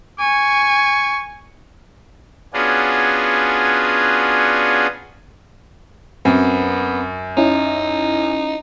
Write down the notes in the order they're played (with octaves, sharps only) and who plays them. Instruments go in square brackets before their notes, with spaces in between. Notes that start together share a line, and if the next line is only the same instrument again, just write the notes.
[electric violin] G#5 [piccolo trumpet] C#6
[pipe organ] B3 C#4 D4 F4 F#4 G#4
[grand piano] F#2 [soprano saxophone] B3 [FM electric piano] C4
[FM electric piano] C#4 E4 [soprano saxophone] D#4